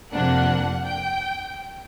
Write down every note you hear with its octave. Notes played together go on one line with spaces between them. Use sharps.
F2 C3 F3 A#3 D4 F#5
G5